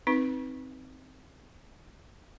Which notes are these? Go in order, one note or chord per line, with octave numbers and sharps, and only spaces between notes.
C4 D#4 B4